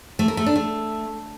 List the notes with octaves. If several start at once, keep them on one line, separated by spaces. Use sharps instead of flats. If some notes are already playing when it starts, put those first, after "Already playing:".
A3
A#4
A3
D4
A3